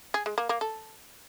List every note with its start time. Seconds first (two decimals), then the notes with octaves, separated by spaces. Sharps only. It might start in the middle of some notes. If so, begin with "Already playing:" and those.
0.14 G#4
0.26 G#3
0.38 A#3
0.49 A#3
0.61 A4